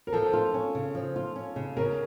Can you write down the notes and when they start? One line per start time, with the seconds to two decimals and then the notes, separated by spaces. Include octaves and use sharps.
0.07 A#4
0.13 F3 A4
0.33 F4
0.54 C#4
0.75 C#3
0.95 F3
1.16 F4
1.36 C#4
1.56 C#3
1.77 C#3 A#4